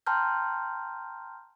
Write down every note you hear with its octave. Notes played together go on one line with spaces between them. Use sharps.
G5 A5 A#5 C6 F6 G6